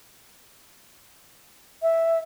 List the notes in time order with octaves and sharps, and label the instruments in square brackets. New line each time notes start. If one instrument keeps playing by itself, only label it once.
[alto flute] E5